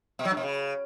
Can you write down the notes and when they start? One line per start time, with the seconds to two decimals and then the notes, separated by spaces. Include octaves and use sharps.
0.19 B2
0.25 F#3
0.31 G2
0.37 B2
0.43 C#3